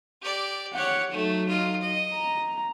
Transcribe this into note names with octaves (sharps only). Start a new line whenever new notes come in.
G4 D5
G4 C#5 F#5
F#3 A3 D#4
F4 D#5
D#5
A#5